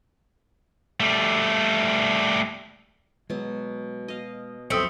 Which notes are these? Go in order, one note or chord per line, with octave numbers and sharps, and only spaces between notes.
G3 A3
B2 F#3 G#3
D#5 F5
B1 F2 B2 A3 C4 D#6 E6 C#7